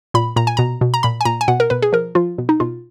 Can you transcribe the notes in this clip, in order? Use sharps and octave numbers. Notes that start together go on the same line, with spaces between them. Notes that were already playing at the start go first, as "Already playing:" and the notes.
A#2 B5
A#2 A#5
G#5
B2 A#5
B2
A#5
A#2 B5
G#5
A#2 A#5
G#5
B2 F#5
A#4
B2 B4
G#4
F3 A#4
F3 F4
B2
D#4
B2 F4